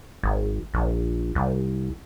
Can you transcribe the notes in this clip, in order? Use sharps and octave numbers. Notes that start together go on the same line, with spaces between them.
G#1
A#1
C2